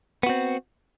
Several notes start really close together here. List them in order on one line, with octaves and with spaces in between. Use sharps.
B3 F#4 C4